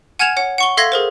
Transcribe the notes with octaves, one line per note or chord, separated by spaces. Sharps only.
F#5 G#5 F6 G#6 E7 F7
C#5 F#5
F#5 C#6 G7
A4 E5 F5 C6 G#6 A#6
G#4 A#4 C5